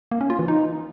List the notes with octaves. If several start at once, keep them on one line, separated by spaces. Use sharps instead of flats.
A#3
C#4
F4
E3
D#4